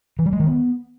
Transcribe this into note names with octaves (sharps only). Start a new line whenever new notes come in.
E3
G3
G#3
D#3
B3